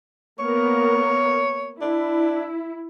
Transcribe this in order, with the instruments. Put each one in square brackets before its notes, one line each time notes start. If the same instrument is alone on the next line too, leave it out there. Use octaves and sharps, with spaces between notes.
[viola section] A#3 B3 A#4 [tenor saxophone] C#5
[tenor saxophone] D4 [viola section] E4